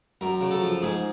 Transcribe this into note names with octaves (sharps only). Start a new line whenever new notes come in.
F#2 A#4
C#3
A4
F3
G#2 G#4